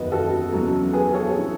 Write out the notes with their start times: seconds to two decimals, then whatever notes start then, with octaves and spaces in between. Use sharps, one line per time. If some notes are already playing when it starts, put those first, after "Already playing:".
Already playing: F#1 E2 D#3 F#4 B4 D#5
0.12 F#4 A4
0.52 E2 C#3 F#3
0.93 G#4 B4
1.13 A4 C#5
1.38 E3